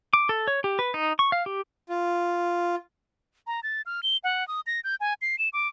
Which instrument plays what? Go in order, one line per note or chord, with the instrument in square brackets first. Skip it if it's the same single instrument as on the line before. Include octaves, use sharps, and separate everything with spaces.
[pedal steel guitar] D6
A4
C#5
G4
B4
D#4
C#6
F5
G4
[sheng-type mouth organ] F4
[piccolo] A#5
A6
F6
G7
F#5
D#6
A#6
G6
G#5
C7
E7
D6